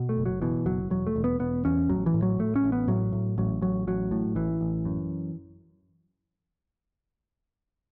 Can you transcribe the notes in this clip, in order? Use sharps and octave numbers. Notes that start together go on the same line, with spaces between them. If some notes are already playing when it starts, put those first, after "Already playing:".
Already playing: B2
A3
F#1
F#3
B2 E3
F#1 F#3
E1 F#3
A3
E1
B3
E1 B3
E2 C#4
A1 F#3
E3
A2
F#3
A2 A3
C#4
A1
B3
A2 F#3
A2
A1 F#3
A1 F#3
A1 F#3
A2
A1 E3
A1
F#2